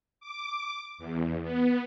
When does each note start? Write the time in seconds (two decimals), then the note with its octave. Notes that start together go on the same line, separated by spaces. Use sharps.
0.20 D6
0.98 E2
1.43 B3